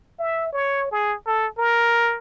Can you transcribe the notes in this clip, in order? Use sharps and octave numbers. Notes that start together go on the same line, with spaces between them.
E5
C#5
G#4
A4
A#4